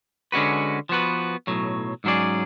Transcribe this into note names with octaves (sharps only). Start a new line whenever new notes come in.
D3 G#3 C#4 F#4 B4
F3 B3 F#4 B4
B1 A2 F#3
G#2 F#3 C#4 G#4 D5